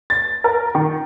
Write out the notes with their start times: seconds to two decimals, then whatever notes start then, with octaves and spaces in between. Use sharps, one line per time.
0.10 A6
0.44 A#4
0.75 D#3